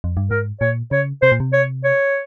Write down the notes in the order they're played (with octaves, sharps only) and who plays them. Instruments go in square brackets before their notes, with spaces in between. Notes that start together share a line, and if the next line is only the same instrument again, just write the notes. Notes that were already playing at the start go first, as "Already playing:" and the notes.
[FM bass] F2
G2
[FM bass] G#2 [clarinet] A#4
[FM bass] A#2 [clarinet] C#5
[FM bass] C#3 [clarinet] C#5
[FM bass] C3 [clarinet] C5
[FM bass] A#2
C3
[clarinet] C#5
C#5